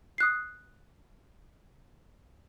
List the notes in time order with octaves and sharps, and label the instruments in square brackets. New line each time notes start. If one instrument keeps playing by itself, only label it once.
[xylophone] D#6 F#6 C7